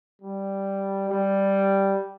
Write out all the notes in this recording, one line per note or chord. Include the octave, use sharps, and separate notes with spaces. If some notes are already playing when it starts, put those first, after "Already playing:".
G3
G3